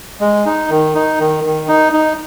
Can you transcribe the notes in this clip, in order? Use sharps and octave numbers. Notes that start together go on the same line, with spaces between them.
G#3
D#4
D#3
D#4
D#3
D#3
D#4
D#4